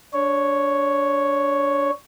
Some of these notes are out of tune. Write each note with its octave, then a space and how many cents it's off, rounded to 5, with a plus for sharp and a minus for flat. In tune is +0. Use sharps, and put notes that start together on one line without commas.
D4 -20 C#5 +0